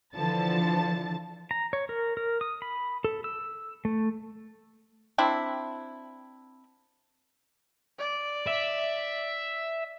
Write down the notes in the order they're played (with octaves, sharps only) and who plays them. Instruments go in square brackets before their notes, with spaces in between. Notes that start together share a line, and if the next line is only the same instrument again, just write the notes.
[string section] D3 E3 F3 A5 A6
[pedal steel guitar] A#5
C#5
A#4
A#4
D#6
B5
A4
E6
A3
[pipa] C4 D4 E4
[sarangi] D5
[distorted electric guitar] E5